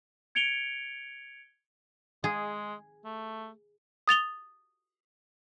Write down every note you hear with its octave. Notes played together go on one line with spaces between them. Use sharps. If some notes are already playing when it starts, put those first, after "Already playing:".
G#6 C#7 D7 F7 G7
G#3 G#4
A3
D#6 A6 F7 G7